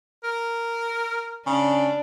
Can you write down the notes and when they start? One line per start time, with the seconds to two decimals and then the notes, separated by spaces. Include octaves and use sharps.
0.24 A#4
1.47 C#3 D4